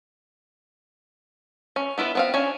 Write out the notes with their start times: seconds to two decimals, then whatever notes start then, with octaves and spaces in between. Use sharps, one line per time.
1.76 C#4
1.98 B3 E4 F4 B4
2.15 B3 C4 F5
2.34 C#4 D4 G#5